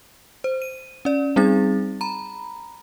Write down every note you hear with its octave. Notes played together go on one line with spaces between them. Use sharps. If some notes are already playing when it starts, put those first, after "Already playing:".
C5
D#7
C#4 D5
G3 C4 D#4 G#4 A6
A#5 B5